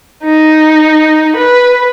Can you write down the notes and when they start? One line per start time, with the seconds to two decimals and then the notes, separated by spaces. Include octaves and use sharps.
0.24 D#4
1.35 B4